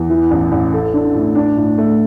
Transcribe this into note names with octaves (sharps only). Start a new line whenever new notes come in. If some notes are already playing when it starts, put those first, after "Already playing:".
Already playing: E2
E3
A1
A1
A4
D4
A2
D4
A2
A3